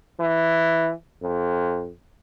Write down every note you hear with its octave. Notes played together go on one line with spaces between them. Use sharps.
E3
F2